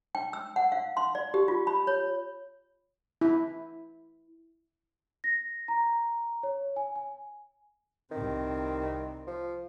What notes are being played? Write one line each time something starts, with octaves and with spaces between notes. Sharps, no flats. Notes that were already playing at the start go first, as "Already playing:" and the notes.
G5
E6
F#5
F5
C6
D5
G4
F4
B5
C#5
E4
A#6
A#5
C#5
G#5
G#5
C2 D#3 C4
F3